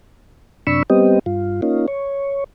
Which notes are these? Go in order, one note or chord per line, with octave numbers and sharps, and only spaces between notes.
F#2 C3 D4 B5 C#6 E6
G3 B3 C4 G4 D#5
G2 F4
A#3 C#4 D#4 F4
C#5